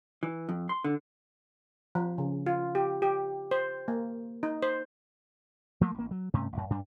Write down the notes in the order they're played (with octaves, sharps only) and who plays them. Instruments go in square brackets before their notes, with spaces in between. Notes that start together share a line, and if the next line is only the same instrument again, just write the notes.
[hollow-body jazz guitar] E3
F2
C6
D3
[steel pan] F3
C#3
F4
G4
G4
C5
A#3
D#4
C5
[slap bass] F3 A3 A#3
A1 A#3
F#3
G2 C3 A3 C#4
A1 F#2
G2 G3 D4